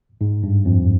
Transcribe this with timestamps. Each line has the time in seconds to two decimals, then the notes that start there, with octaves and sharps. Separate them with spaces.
0.21 G#2
0.43 G2
0.65 F2